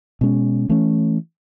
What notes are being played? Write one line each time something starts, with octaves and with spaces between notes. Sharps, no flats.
B2 G#3 C#4
E3 A3 C#4